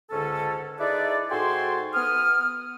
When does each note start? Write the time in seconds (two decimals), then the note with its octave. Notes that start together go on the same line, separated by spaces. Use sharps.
0.10 C#2 G#2 D3 C#4 A4
0.79 D#4 E4 G#4 A4 B4 D5
1.31 G#2 F#4 A4 G5 G#5 C6
1.94 B3 D#6 F6